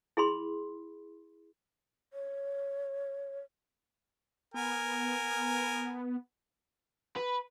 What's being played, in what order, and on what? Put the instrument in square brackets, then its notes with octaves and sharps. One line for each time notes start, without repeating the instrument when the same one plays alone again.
[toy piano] E4 G#4 B5 C6
[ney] C#5
[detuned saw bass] B3 [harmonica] A#4 G#5
[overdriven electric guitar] B4